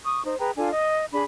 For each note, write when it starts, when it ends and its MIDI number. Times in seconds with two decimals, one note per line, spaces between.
0.04 0.22 85
0.04 0.22 87
0.25 0.36 63
0.25 0.36 72
0.39 0.51 68
0.39 0.51 71
0.39 0.51 79
0.39 0.51 82
0.57 0.70 62
0.57 0.70 65
0.57 0.70 69
0.57 0.70 80
0.71 1.05 75
1.12 1.23 62
1.12 1.23 68
1.12 1.23 83